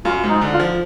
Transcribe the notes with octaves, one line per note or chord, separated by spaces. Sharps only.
F#2 F4
G#2
D#4
D3
F4
F3